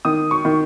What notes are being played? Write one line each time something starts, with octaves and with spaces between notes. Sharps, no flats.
D#3 D#6
C#6
D#3